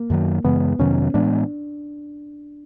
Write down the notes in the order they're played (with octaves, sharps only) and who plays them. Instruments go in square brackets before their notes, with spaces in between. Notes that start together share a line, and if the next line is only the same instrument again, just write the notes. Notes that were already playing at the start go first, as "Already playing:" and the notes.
Already playing: [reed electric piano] A#3
[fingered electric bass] F#2 D#3 F#3
[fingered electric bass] F#2 C#3 E3 G#3 [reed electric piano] B3
[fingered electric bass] F2 C3 D#3 F#3 [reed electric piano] C#4
[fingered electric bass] A2 E3 G#3 B3 [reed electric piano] D4